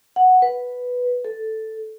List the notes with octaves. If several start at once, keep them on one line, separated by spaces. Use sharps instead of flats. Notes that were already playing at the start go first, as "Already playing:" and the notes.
F#5
B4
A4